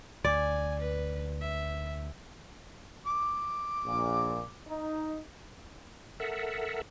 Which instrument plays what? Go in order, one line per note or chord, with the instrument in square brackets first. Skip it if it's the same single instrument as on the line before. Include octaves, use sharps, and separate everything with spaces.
[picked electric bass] D2 [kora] D5 [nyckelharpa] G#5
[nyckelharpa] B4
E5
[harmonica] D6
[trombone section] A#1 A#2
D#4
[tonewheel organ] A4 A#4 E5 F#5